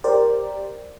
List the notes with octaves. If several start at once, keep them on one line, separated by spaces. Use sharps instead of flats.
G4 A#4 C5 D5